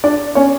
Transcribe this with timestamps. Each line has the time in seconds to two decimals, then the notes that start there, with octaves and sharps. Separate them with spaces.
0.04 D4 D5
0.35 C#4 C#5